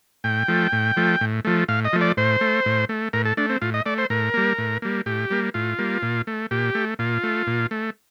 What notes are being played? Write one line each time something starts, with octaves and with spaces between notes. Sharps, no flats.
A2 G5
F3 A3
A2
F3 A3
A2
F3 A3
A2 F5
D#5
F3 A3
D5
A2 C5
A3
A2
A3
A2 A#4
A4
A3 D4
C4
A2 F4
D#5
A3 D5
C5
A2 A#4
G3 A#3
A2
G3 A#3
A2 G4
G3 A#3
A2 F4
G3 A#3
A#2
A3
A#2 G4
A3
A#2 F4
A3
A#2
A3